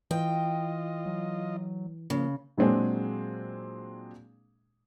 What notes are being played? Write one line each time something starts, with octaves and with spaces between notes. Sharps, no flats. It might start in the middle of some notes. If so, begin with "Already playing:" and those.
E3 F4 D#5 G5
F#3
C#3 F3 A#3
A#2 F#3 G#3 C4 D4 G#4